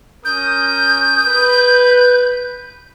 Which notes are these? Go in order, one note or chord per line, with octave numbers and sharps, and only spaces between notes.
C#4 A#4 D#6 G6
B4